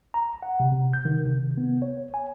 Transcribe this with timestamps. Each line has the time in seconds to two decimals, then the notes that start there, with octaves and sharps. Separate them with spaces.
0.14 A#5
0.43 F#5
0.60 C3
0.72 C3
0.93 G6
1.05 D#3
1.26 C3
1.58 B3
1.82 C#5
2.14 G#5